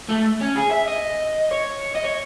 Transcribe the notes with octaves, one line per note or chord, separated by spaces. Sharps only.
A3
C#4
G#4
E5
D#5
C#5
D#5
C#5